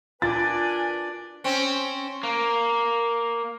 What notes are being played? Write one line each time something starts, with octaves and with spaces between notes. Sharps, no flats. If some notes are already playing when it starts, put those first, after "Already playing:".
D4 F4 A#4 B4 D5 G#5 A6
C4 C#4
A#3